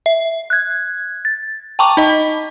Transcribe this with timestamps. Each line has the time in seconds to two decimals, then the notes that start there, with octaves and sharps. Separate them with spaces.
0.06 E5
0.50 F#6 G#6
1.25 A6
1.79 G5 A5 A#5 C#6 D6
1.97 D#4 D#5